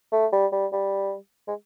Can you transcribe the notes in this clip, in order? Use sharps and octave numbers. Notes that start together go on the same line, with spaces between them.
A3
G3
G3
G3
G#3